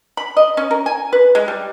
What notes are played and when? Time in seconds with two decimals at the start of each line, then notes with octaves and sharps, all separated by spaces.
0.17 B5
0.37 D#5
0.57 C#4
0.71 A#4
0.86 G#5
1.13 B4
1.35 G#3
1.48 G3